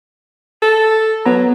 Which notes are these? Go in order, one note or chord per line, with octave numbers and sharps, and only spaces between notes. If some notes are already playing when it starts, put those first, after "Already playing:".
A4
F#3 B3 A#5